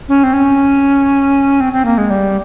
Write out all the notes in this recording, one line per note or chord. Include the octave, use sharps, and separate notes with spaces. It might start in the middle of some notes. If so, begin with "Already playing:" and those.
C#4
C4
C#4
C4
C4
A#3
G#3
G3